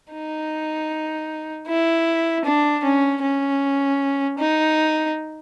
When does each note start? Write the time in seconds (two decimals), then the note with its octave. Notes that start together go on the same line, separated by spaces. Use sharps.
0.12 D#4
1.68 E4
2.45 D4
2.84 C#4
3.22 C#4
4.39 D#4